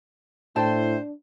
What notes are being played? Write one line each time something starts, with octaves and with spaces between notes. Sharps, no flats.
A2 D4 E4 C5 G5 A5